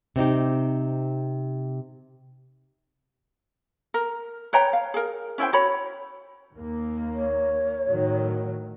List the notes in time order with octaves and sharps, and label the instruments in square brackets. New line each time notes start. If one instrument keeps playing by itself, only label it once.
[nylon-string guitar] C3 C4 D#4 G4
[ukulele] A#4
B4 C#5 G5 A#5
F5
G#4 A#4
C#4 E4 C5 G5
F#4 C#5 B5
[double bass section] D#2 A#3
[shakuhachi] C#5
[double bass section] A2 D#3 F#3